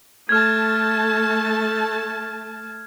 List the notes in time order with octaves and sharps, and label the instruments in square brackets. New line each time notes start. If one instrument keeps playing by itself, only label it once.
[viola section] A3 A5 [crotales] F6 G#6